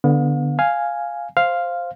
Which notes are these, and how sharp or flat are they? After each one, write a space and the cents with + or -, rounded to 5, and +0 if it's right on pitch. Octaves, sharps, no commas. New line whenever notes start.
D3 +0 B3 +0 F5 +45
F5 +0 G#5 +0
C5 +0 F5 +0